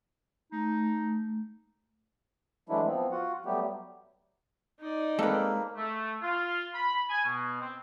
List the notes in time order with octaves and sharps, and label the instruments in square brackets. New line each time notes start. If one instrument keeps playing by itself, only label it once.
[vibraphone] A3 [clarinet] D#4
[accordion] E3 F#3 G#3 A3 D4 E4
F3 B3 C4
F4 F#4 F#5
F#3 G3 A3 B3 G4
[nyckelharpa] D#4 D5
[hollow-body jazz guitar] G#3 C4 [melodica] A#3 [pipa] A4 B4
[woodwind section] A3
F4
B5
G#5
B2
C4